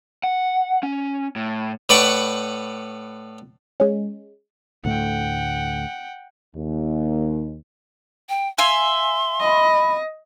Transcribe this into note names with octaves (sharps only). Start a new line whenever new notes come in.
F#5
C#4
A2
A2 B4 D5 F#5 G5 C#6
G#3 C#4
D2 A2 A3 F#5 G5
D#2
G5
E5 F5 G#5 C6
D#5 B5